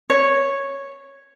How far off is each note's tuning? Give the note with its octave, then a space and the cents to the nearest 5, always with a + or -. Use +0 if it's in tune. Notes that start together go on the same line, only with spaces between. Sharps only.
C#5 -5